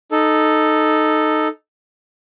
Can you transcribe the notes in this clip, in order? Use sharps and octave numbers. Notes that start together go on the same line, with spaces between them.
D#4 A4